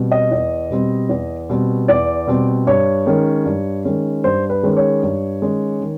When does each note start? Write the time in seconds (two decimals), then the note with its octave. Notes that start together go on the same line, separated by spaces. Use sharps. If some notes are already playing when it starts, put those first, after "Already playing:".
Already playing: B2 G3 C4
0.12 D#5
0.31 E2
0.70 B2 G3 C4
1.09 E2
1.50 B2 G3 C4
1.88 E2 D5
2.27 B2 G3 C4
2.67 G2 C#5
3.06 D#3 G#3 C#4
3.45 G2
3.85 D#3 G#3 C#4
4.24 G2 C5
4.50 B4
4.63 D#3 G#3 C#4
4.77 C#5
5.03 G2
5.42 D#3 G#3 C#4
5.81 D#3